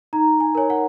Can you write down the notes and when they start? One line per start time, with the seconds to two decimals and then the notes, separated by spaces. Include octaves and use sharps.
0.13 D#4 A#5
0.40 G#5
0.55 A#4 C#5 G#5
0.70 F#5